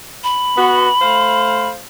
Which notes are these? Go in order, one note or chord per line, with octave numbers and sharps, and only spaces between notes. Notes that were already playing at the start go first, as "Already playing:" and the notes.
B5
B3 F#4
A3 C5 F5